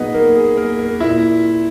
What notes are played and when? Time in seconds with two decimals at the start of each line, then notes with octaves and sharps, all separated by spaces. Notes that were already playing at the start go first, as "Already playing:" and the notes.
Already playing: A#2 F#3 B3 D#4 G#4 B4 D#5
0.14 A#3 A#4
0.36 G#4
0.57 A#3 A#4
0.79 A#3 A#4
1.00 A#2 E4 E5